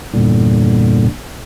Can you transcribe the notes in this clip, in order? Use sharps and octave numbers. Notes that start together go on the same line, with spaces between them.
E2 G2 A#2 D3